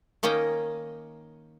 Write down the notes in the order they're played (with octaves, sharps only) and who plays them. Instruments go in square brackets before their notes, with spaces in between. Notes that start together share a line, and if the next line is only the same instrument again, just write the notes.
[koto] D#3 A#3 C#4 D#5 G5